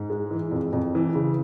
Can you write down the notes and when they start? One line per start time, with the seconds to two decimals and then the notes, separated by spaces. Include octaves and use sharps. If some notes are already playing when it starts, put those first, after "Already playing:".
Already playing: G#2
0.10 G#3
0.31 E3
0.51 F2
0.73 F2
0.95 E3
1.15 C#3